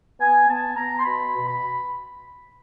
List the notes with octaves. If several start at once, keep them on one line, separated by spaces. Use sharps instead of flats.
B3 G#5
B3 A5
B3 A#5
C6
B2 B5
B2
B5